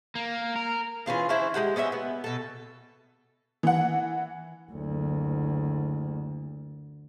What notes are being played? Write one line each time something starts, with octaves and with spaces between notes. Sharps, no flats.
A#3
A#4
E3 C#4 F4 G#4
C#4 D4 E4 C5
G#3 B3 G4 F#5
B3 C#4 D#5 E5
B3
B2 A4
E3 F#5
F#1 D2